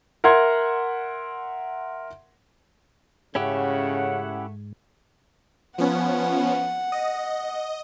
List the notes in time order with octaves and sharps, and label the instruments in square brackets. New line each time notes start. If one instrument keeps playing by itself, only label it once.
[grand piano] A#4 E5 F#5 C6 G#6
[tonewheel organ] G#2 [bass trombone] C#3 [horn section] A3 F#5 [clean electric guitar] C#4 E4 G4
[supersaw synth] F3 B3 C#4 [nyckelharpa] F#5
[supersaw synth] D#5